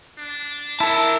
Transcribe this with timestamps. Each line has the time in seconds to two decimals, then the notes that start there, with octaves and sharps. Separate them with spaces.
0.19 D4
0.80 E4 A#4 A5